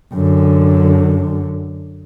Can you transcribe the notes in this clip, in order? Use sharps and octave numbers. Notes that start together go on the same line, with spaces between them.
F#2 D3